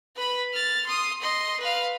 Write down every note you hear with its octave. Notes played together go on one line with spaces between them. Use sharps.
B4 B5
F6 A6
C6 D#6
D#5 C6
B4 F5